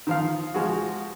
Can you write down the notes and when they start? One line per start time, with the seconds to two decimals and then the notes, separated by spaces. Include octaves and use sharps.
0.07 D#3 F3 F5
0.54 F3 G#3 F#4